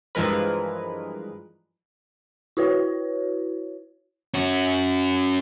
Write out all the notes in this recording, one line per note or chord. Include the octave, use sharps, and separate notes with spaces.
G2 E3 F3 G#3 A#4 B4
E4 F#4 B4 C#5
C#4 F#4